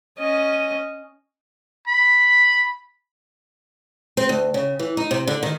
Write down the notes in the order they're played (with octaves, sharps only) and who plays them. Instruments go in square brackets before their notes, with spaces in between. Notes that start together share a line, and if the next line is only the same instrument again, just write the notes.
[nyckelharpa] C#4 D#5
[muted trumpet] B5
[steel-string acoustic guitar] C4
D2
C#3
E3
D#4
C3
D3
D#3